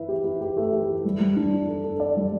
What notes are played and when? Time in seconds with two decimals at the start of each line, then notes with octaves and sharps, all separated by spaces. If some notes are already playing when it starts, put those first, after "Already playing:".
Already playing: E4 B4
0.09 G4
0.25 E4
0.41 G4
0.57 A3
0.73 G4
0.89 E4
1.05 G3
1.20 G3
1.36 D4
1.53 D4
1.68 A4
1.84 A4
2.00 D5
2.17 G3